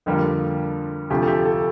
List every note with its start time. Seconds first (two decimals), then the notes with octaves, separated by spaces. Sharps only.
0.06 F2 D3 G3 A#3 F4
1.10 D2 C3 F3 A3 G4
1.23 A4
1.27 G4
1.45 A4